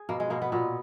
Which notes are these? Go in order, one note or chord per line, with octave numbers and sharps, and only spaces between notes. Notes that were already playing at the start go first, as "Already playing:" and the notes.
Already playing: G#4
B2 A#3
G#3
B2 A#3
B3
A#2 B3